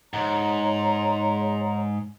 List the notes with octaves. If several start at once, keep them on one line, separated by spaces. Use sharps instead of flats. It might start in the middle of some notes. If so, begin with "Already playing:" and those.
G#2 C#5 A#5 C6